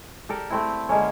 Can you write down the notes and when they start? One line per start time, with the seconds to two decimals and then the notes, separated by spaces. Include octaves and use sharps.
0.29 G4 A4 A#4 D5
0.50 A3 C4 E4
0.89 D3 G#3 A#3 C#4